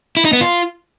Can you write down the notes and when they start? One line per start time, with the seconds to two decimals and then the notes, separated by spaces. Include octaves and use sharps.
0.17 E4
0.25 D#4
0.33 B3
0.41 F4